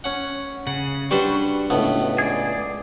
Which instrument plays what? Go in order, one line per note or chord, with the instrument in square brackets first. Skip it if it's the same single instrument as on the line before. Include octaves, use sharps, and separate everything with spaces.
[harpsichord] C#4 F#5
[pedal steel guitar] C#3 [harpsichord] F#5
[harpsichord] G3 B4 C5 [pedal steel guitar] D4 F#4 C#6
[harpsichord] C#2 A2 B3
[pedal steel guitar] G#4 D5